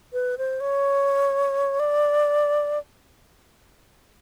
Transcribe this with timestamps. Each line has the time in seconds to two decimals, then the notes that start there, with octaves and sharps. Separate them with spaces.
0.13 B4
0.38 C5
0.61 C#5
1.80 D5